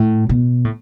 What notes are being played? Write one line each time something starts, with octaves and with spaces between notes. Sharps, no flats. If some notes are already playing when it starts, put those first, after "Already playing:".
Already playing: A2
B2
A2